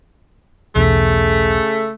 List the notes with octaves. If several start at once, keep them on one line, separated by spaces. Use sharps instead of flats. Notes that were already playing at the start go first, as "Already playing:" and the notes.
B1 E2 C#3 A3